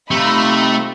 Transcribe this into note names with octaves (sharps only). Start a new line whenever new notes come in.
C3 A3 D#4 F4 B5